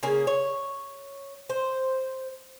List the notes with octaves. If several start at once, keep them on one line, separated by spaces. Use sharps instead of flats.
C#3 A#3 G#4
C#5
C5